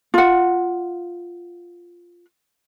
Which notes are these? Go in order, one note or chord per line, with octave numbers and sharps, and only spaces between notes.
F4 F#5